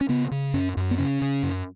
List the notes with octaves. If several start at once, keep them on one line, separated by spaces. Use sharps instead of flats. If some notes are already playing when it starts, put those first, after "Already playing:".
C#4
C#3 B3
C#3
F#2 C#4
F#2
B3
C#3 C#4
C#3
F#2